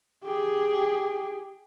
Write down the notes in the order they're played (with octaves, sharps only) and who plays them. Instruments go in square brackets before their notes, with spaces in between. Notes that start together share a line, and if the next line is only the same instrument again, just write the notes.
[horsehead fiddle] G4 G#4